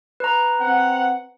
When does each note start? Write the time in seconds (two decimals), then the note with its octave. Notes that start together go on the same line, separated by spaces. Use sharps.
0.20 B4 A#5
0.61 C4 F#5